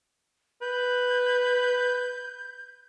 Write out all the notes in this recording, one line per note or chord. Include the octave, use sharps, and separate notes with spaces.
B4 G6